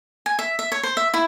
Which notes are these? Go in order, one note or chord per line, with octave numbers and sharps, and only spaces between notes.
G#5
E5
E5
C#5
C5
E5
E4